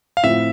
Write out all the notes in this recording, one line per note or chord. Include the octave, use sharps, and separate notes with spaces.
F5
A2 F3 C4 F4 E5